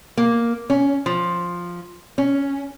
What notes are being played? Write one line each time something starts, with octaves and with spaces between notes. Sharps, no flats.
A#3
C#4
F3
C#4